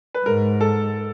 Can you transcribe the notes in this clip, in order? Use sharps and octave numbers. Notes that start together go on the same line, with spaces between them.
B4
G#2 A#4
A4